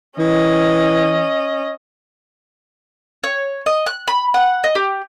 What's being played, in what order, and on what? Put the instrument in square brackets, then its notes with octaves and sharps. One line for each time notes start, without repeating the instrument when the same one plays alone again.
[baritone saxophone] E3 [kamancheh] C#4 D#5
[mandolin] C#5
D#5
F#6
B5
F#5
D#5
G4